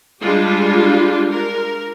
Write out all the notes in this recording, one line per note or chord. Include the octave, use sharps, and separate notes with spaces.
G3 G#3 D4 F4 G4
A#4